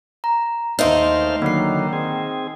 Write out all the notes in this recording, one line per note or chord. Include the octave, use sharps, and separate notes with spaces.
A#5
D#2 A3 D#4 A#4 C5 E5 F5 C6
D3 D#3 F#3 A#3 C7
C4 G#4